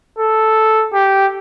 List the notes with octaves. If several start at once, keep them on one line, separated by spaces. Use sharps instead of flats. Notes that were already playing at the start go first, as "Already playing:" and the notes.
A4
G4